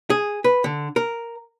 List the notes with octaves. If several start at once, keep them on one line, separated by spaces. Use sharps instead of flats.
G#4
B4
D3
A#4